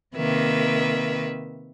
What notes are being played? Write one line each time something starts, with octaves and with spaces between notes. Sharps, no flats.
C3 D#3 A#3 B4 E5